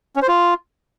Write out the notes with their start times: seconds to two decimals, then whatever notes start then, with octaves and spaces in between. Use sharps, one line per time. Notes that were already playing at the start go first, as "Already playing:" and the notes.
0.16 C#4
0.22 C5
0.28 F4